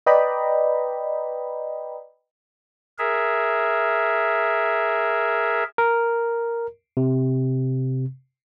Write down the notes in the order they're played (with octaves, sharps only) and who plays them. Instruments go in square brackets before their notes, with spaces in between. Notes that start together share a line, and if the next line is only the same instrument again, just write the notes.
[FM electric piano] B4 D5 D#5 G5 A#5 B5
[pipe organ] G#4 A#4 E5
[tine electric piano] A#4
C3